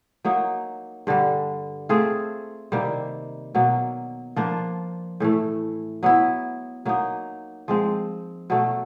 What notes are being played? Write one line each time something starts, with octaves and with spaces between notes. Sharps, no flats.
F#3 A#3 D#4
G2 D3 G3
A3 C4 F4 G#4
C3 D#3 G3 A#3
B2 F#3 A#3
F3 A#3 D4 F4
A2 E3 A3
F#3 B3 E4
F#3 A#3 D#4
F3 G#3 C4
B2 F#3 A3